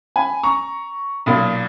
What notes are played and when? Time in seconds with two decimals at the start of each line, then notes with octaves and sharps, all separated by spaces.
0.16 G#5 B5
0.43 A#5 C#6
1.26 B1 A#2 A#3 B5 D#6